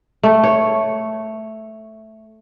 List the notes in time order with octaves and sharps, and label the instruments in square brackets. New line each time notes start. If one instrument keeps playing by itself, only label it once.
[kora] A3
C#5